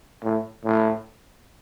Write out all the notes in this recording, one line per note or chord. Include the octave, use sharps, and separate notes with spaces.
A2
A2